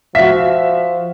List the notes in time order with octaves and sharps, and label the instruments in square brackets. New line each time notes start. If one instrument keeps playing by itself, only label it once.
[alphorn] F3 [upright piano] F#4 B6 [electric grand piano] E5 F5